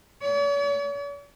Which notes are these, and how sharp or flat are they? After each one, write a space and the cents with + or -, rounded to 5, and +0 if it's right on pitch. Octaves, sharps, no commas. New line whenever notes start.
C#5 +45